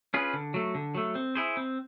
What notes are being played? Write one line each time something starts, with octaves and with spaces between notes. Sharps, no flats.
C#4 F4 G#4 B4
D3
F#3 A3
D3
F#3 A3
C4
E4 G#4 C5
C4